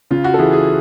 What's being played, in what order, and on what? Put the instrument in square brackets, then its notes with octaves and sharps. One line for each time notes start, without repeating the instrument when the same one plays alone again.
[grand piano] C#3 F4
F#4
A4
E3 G#4
G#4